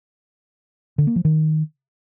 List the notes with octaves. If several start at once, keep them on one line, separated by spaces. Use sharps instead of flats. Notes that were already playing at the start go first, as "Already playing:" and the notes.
D3
A#3
F3
D#3